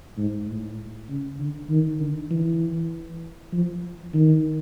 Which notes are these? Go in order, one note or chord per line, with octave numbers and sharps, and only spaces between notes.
G#2
A2
C#3
D3
D#3
D3
E3
F3
D#3